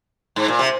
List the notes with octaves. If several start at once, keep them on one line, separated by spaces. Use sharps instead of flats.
G#2
A#2
C3